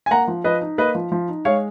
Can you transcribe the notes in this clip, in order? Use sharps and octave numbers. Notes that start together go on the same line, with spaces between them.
G#5
A#3 F#5 A#5
F3
F3 B4 D#5
D#4
A#3 B4 D#5
F3
F3
D#4
G#3 C#5 F5